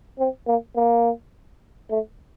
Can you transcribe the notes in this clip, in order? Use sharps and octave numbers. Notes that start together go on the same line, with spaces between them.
C4
A#3
A#3
A3